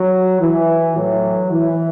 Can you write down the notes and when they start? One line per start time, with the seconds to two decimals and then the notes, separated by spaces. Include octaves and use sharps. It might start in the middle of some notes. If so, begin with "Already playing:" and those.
Already playing: F#3
0.41 E3
0.95 A2 E3 F#3
1.50 E3